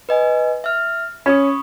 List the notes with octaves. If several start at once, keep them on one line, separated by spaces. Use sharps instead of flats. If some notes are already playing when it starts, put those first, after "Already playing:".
B4 D#5 G#5
E5 F6
C#4 B5 C#6 D#6